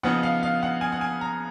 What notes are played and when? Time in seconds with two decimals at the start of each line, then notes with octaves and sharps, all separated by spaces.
0.03 C#3 F3 B3 D#4 F#5
0.23 F5
0.43 F5
0.63 F#5
0.81 G#5
0.92 F#5
1.01 G#5
1.21 A#5